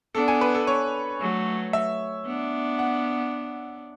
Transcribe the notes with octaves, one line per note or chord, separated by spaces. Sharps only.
B3 D4 A4
G#5
B4
A4
C#5
F#3 A3
E5
B3 D4
F#5